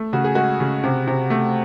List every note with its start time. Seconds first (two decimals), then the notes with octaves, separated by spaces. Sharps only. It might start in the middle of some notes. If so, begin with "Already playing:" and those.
Already playing: A3
0.13 C#3 F#4
0.24 G#4
0.35 G#3 F#4
0.60 C#3
0.84 C3
1.07 C3
1.30 A3